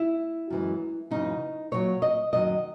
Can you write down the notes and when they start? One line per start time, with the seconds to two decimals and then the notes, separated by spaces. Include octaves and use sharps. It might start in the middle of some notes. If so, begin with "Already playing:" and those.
Already playing: E4
0.50 F#2 E3 G#3
1.11 F#2 C#3 E3 D#4
1.72 A#2 F#3 C#5
2.02 D#5
2.33 F#2 D#3 F#3 D#5